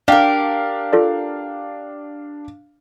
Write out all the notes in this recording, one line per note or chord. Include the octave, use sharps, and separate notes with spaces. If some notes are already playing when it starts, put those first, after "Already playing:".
D4 G4 A#4 F5
F4 A4 D5